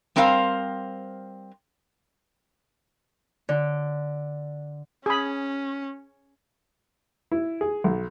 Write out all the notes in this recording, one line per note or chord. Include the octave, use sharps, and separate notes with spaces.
G3 C4 A#4 C5 E5 F5
D3
C#4 G#4 B5
E4
G#4
B1